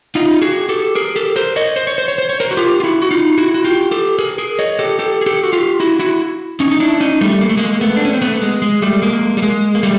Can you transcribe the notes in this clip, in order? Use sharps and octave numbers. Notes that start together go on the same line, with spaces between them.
D#4 F4
F#4 G#4
G4 A4
G#4 A#4
G4 A4
A#4 C5
C#5 D#5
C5
C#5
C5
C#5
C5
C#5
A#4 C5
F#4
F4 G4
F4
E4 F#4
F#4
D#4 F4
E4 F#4
F#4
F4 G4
G4 A4
G#4 A#4
G#4 A#4
C#5 D#5
G4 A4
G4 A4
G#4
G4 A4
F#4
F4 G4
E4 F#4
E4 F#4
C#4 D#4
D#4
D4 E4
C#4 D#4
G3 A3
A#3
A3
G#3 A#3
A3 B3
D4
C#4
C4
A3 B3
G#3
G#3
G3 A3
G#3 A#3
G3
G#3
A#3
G3 A3